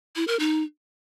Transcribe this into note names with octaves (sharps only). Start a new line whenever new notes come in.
E4
A#4
D#4